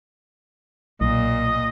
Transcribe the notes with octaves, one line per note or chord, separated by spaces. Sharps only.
B1 A#2 D#5